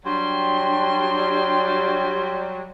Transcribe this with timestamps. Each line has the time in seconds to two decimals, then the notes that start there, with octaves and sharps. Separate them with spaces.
0.05 F#3 G3 D4 C6